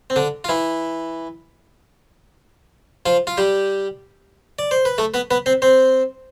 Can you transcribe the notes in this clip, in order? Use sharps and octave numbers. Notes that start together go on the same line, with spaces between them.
C4
D3 D4
F4
E3 E4
F3 F4
F4
G3 G4
D5
C5
B4
A3 A4
B3 B4
B3 B4
C4 C5
C4 C5